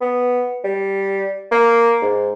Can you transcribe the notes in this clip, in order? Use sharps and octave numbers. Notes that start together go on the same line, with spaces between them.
B3
G3
A#3
G#2